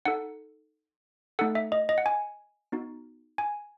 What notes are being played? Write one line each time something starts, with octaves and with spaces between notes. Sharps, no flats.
D#4 A4 F#5
A3 D#4 A4 F#5
E5
D#5
D#5
F#5
G#5
B3 D#4 F#4
G#5